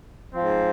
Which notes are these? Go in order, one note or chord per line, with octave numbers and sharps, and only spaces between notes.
G#2 F3 C4